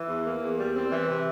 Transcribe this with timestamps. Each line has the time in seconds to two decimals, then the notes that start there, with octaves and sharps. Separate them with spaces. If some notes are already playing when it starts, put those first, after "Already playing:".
Already playing: E3
0.09 E2
0.26 A#3
0.41 E2
0.58 G3
0.75 C4
0.91 E3
1.08 C3